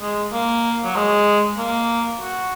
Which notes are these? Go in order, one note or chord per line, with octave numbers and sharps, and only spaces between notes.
G#3
A#3
F#3
G#3
A#3
F#4